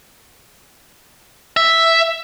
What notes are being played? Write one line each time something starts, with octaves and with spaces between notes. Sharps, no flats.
E5